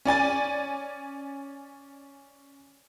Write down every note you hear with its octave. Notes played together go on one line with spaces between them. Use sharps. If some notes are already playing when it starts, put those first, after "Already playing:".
C#4 D5 G#5 A6